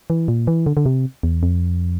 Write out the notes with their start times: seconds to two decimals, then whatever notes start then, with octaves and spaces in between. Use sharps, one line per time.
0.10 E3
0.28 A#2
0.47 E3
0.66 D3
0.77 D3
0.86 C3
1.23 E2
1.43 F2